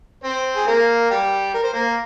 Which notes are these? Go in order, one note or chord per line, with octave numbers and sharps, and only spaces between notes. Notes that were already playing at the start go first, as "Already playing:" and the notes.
C4 C5
G#4
A#3 A#4
G3 G4
A#4
C5
A#3 A#4